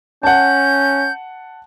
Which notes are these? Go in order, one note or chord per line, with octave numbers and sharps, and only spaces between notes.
C#4 F#5 A5 G6